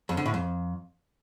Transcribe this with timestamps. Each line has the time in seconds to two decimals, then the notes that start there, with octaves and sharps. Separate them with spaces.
0.09 F2
0.17 D3
0.26 A2
0.34 F2